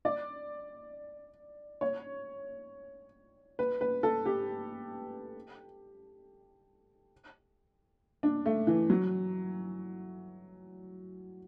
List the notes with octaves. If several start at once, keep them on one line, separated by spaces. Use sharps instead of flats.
D5
C#5
B4
B4
A4
G4
D4
A3
E3
F#3